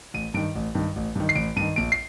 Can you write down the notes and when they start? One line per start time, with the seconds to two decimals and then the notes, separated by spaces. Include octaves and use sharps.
0.14 A1 D#7
0.34 G2 D#3 D7
0.55 A1
0.75 G2 D#3
0.96 A1
1.15 G2 D#3
1.29 C7
1.35 A1 D7
1.56 G2 D#3 D#7
1.76 A#1 D7
1.92 C7